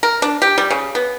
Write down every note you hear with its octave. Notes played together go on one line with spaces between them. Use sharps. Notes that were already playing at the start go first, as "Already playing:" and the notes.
A#4
D4
G4
G3
C#3
B3